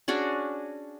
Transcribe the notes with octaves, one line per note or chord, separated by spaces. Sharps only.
C#4 D4 F#4 G#4